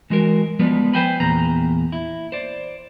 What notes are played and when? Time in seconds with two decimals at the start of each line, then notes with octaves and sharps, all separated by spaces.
0.10 E3 G#3 F#4 A#4
0.59 F3 G3 G#3 B3 B4 D5
0.93 B4 C5 E5 G5 G#5 B5
1.20 E2 A#2 A#5 B5
1.92 E4
2.32 C5 D5